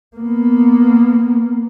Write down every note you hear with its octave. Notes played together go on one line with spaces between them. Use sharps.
A#3 B3